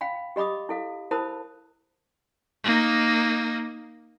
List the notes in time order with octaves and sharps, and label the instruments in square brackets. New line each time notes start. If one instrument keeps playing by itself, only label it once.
[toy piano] F5 G5 B5
G4 D#5 B5 D6 D#6
E4 A4 F5
E4 A#4 C5 A5 B5 D#6
[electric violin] A#3 D#4